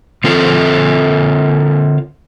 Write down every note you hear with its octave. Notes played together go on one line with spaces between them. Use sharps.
D3 C4 F4 A4